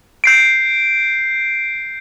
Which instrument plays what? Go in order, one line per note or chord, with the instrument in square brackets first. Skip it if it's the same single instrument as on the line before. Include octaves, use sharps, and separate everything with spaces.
[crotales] G6 C7 D7